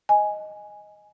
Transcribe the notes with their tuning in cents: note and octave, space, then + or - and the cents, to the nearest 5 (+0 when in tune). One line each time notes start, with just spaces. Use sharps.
D#5 +0 G#5 +0